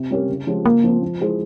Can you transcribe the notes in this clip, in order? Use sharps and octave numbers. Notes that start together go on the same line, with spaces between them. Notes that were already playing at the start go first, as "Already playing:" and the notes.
Already playing: C3
G3 C#4 G4 A#4
C#3
F3 G#3 C#4 G4
C#3 A#3
F3 C4
F3
G#3 E4 G#4 C5